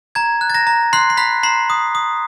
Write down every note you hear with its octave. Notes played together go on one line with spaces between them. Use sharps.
A#5 G#6
F#6
A6
A#5 A#6
A#5
C6 F#6 C7
C7
B5 F#6 B6
A#5 C6 C7
D#6
D#6